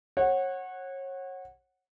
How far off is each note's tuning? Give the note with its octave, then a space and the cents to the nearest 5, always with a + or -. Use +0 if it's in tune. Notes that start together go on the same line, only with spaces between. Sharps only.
C#5 -30 F#5 +0